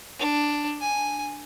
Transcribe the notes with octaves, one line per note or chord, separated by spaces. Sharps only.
D4
G#5